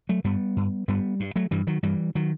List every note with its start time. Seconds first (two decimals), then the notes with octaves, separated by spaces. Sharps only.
0.09 F#3 A3
0.24 G2 G3 B3
0.57 G2
0.88 G2 G3 B3
1.20 G2
1.36 F#3 A3
1.51 G2 E3 G3
1.67 D#3 F#3
1.83 G2 E3 G3
2.15 D#3 F#3